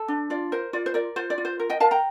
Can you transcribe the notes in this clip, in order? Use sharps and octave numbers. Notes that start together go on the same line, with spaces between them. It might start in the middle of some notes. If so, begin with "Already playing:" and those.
Already playing: A4
D4
F4 D5
A#4 C5
F4 D5
C5
A#4 D5
F4 C5
D5
F4
C5
A#4
D#5 G5
A#4 F5 A5
G5 A#5